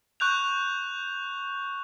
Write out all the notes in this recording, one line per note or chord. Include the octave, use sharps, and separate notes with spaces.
C#6 F#6 G6 F7